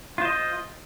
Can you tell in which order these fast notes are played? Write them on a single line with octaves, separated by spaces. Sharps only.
F4 C5 D#5